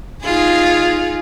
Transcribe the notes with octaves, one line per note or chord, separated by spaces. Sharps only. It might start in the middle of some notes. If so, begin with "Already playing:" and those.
D#4 F4 G#4